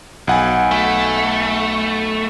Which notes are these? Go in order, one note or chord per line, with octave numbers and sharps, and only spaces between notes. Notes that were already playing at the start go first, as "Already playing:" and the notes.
B1 F#5 G#5
A3